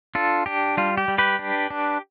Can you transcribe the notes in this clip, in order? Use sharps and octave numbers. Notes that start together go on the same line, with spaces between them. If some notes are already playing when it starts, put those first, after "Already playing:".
D4 F4 A4
D4 G4
G3 F4
G4
G3
G4 B4
D4
D4